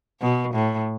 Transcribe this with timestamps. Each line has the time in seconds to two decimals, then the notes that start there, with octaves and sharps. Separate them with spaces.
0.21 B2
0.54 A2